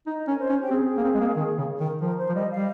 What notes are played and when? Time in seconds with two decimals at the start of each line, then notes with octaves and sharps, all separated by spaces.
0.05 D#4 D#5
0.28 C#4 A#4
0.39 C5
0.49 C#4
0.60 G4
0.70 C4 G#4
0.97 A#3
1.04 C4
1.14 G#3
1.20 A#3
1.36 D#3
1.58 C#3
1.80 D#3
2.01 F3 A#4
2.18 C5
2.29 F3
2.34 G3 D#5
2.50 F5
2.57 G3